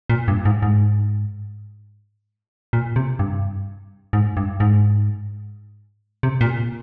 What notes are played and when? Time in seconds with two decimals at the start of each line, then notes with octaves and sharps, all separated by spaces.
0.10 A#2
0.28 G2
0.45 G#2
0.62 G#2
2.73 A#2
2.96 C3
3.19 G2
4.13 G#2
4.37 G2
4.60 G#2
6.23 C3
6.41 A#2